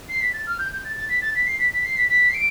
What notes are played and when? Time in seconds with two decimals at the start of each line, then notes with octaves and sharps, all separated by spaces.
0.09 C7
0.21 B6
0.33 A6
0.47 F6
0.59 G6
0.72 G6
0.85 A6
0.96 A6
1.09 B6
1.22 A6
1.35 B6
1.46 C7
1.59 B6
1.72 B6
1.84 C7
1.97 B6
2.09 B6
2.29 C7
2.34 D7